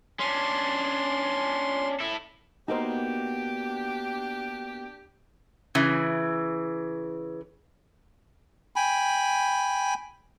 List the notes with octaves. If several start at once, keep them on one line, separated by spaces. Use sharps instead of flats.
C#4 D4 C6
E4 A4
A#3 B3 D4 D#4 F#4 G4 A#4 C5
C#3 E3
G5 G#5 B5